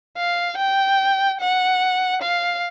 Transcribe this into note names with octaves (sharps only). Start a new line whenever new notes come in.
F5
G5
F#5
F5